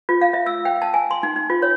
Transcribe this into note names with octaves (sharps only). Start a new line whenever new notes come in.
F4
F5
E5
E6
G5
A5
G#5
C6
D#4
D#4
F4
C#5